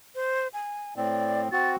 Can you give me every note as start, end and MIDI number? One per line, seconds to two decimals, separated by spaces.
0.15 0.48 72
0.53 0.94 80
0.96 1.49 45
0.96 1.49 60
0.96 1.41 74
1.52 1.76 60
1.52 1.76 66
1.52 1.70 93